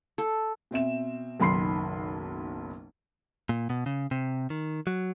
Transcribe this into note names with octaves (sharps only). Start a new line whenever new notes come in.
A4
B2 C4 E5 E7
F#1 B1 D#3 B5 C6 C7
A#2
B2
C#3
C3
D#3
F#3